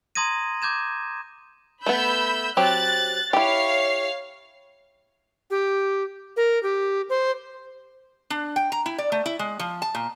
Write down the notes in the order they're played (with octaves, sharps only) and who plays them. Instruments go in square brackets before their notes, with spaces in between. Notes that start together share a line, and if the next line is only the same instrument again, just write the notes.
[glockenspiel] A#5 C6 D#6 G#6 A#6 D#7
D6 G6 G#6 E7
[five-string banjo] A3 B3 [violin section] B5 E6 G6
[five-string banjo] F#3 C4 G4 [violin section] F#6 A6
[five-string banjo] E4 G4 [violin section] C#5 F5 C7
[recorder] G4
A#4
G4
C5
[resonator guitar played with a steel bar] D4
G5
A#5
E4
D5
A3
E4
G#3
F3
A5
A#2